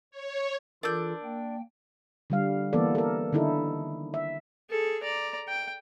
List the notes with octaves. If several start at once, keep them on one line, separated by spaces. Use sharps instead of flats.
C#5
E3 D4 F4 A4 A#4 E6 G6
A#3 G5
D3 G3 F5
E3 A#3 B3 A4 D5
A4 A#4
D3 D#3 D#4 E4 A4
E5
G#4 A4
D5 A#5
G5